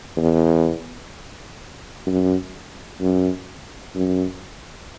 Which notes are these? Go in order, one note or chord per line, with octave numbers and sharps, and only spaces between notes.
E2
F#2
F#2
F#2